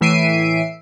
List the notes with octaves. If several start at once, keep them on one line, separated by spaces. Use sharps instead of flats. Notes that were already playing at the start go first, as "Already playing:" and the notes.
A2 E3 E5 C7 D7 D#7